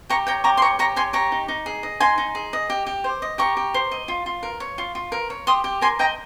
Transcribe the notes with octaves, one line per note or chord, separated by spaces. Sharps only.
G4 A#5 C#6
C#5 G5 A#5
G4 A#5 C#6
C6
C#5 A#5 C#6
G4 A#5 C#6
C#5 G#5 C6
G4 A#5 C#6
D#4
D#4
G#4
D#5
D#4 G#5 C6
D#4
G#4
D#5
G4
G4
C5
D#5
G4 A#5 C#6
G4
C5
D#5
F4
F4
A#4
C#5
F4
F4
A#4
C#5
G4 C6 D#6
G4
A#4 G#5 C6
D#5 G5 A#5